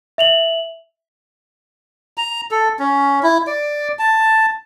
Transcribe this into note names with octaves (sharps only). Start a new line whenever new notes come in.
E5 F7 F#7
A#5
A4
C#4
E4
D5
A5